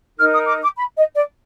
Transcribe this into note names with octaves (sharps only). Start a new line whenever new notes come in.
D#4 A#4 F6
D#6
D6
D6
B5
D#5
D5